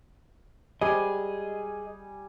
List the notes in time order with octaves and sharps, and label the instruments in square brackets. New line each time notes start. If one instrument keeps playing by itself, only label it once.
[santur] G3 G#5 [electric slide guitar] G#4 D#5